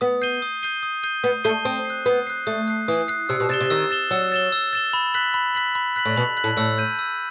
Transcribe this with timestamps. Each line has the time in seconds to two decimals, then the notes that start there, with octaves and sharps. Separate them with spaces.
0.01 B3 D#6
0.22 G6 C7 D#7 G7
0.42 D#6
0.63 G6 C7 D#7 G7
0.83 D#6
1.03 G6 C7 D#7 G7
1.24 B3 D#6
1.44 A3 G6 C7 D#7 G7
1.65 C4 D#6
1.85 C7
1.90 F#6
2.06 B3 D#6
2.27 F#6 C7
2.47 A3 D#6
2.68 F#6 C7
2.88 E3 D#6
3.08 F#6 C7
3.29 C3 E6
3.40 B2
3.49 C3 A6 E7 G7
3.61 C3
3.70 D#3 E6
3.91 A6 E7 G7
4.11 F#3 E6
4.32 A6 E7 G7
4.52 E6
4.73 A6 E7 G7
4.93 B5
5.14 F#6 B6 F#7
5.34 B5
5.55 F#6 B6 F#7
5.75 B5
5.96 F#6 B6 F#7
6.05 A2
6.16 B2 B5
6.37 F#6 B6 F#7
6.44 A2
6.57 A2 E6
6.78 G6 D#7
6.99 E6